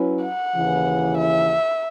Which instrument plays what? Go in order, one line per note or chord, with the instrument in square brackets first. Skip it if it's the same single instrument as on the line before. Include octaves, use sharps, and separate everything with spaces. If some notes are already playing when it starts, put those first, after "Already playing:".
Already playing: [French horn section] F#3 C#4 E4 B4
[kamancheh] F#5
[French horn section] D#2 C#3 E3
[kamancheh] E5